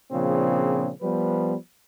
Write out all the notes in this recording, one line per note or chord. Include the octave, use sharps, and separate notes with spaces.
A#2 C#3 F3 C4 D4 G#4
F3 G3 B3 B4